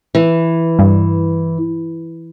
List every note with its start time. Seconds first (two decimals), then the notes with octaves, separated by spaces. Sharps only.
0.15 E3
0.79 G2